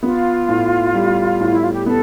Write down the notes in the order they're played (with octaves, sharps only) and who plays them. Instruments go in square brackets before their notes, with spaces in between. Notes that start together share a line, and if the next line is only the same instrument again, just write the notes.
[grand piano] B3 [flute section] F4
[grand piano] A2
G3
A2
[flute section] E4
F4
G4
[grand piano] B3 [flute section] A4